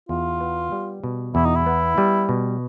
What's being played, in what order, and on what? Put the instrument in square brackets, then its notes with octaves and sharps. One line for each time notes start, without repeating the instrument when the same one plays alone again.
[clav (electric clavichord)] E2 [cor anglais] F4
[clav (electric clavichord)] B3
G3
B2
[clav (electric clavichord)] E2 [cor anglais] E4
[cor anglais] D#4
E4
[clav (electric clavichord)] B3
G3
B2